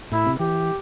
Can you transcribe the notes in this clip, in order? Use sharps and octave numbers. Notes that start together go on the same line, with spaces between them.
A2 E4
C3
E3 G4